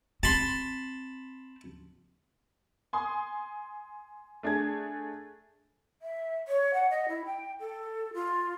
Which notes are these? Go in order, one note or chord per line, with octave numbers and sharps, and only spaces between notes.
C4 A5 B5 C6
G#5 C6 D#6
A3 D4 G#4 G#6
E5
C#5
F#5
D#5
E4
G5
A4
F4